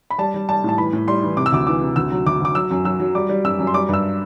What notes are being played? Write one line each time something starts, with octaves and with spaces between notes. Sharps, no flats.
B5
G3 A5
G3
G3 A5
A2 A5
E3 B5
A2
G3 C6
E3
C3 D6
E6
D2 D6
E3 D6
C3
D2 E6
F#3
D2 D6
D2 D6
F#3 E6
F#2
F#3 E6
F#3
G3 D6
G3
F#2 E6
F#2
C6
G3 D6
G2 E6